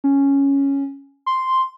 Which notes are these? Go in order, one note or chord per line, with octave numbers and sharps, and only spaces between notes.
C#4
C6